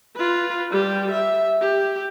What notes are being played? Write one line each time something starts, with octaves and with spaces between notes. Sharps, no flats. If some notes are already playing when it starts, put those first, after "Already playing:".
F4 B4
G3 G4
E5
G4